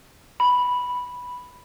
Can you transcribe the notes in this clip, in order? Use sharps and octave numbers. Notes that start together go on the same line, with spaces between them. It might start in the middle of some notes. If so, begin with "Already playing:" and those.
B5